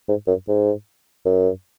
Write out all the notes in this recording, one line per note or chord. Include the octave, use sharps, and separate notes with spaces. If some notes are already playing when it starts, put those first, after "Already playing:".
G#2
F#2
G#2
F#2